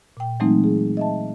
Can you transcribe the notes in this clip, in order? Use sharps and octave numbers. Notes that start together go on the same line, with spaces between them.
A#2 G5
E3 F#3 G#3 A3 C4 D#4
G#4
D#5 E5 A5